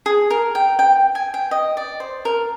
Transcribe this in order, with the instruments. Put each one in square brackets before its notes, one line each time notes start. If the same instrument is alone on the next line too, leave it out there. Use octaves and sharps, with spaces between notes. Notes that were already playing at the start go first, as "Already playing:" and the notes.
[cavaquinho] G#4
A#4
G5
G5
G#5
G5
D#5
D5
C5
A#4